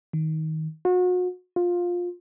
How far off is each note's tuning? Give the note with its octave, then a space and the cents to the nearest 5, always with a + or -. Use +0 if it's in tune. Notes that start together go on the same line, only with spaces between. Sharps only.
D#3 +20
F#4 -35
F4 +15